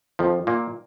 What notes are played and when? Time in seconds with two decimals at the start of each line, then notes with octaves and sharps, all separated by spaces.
0.19 F2 F3
0.47 A#2 A#3